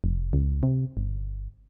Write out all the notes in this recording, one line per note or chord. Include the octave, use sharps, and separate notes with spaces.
F1
C#2
C3
G1